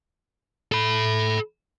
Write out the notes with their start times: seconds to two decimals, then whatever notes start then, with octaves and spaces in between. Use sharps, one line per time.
0.72 A4 B5